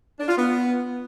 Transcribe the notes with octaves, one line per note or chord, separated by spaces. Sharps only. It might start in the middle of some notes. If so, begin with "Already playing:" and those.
D4
F4
B3